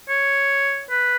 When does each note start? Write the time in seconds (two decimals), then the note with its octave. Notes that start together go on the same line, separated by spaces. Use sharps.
0.09 C#5
0.90 B4